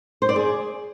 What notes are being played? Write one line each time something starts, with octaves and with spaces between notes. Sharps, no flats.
C5
D5
G#4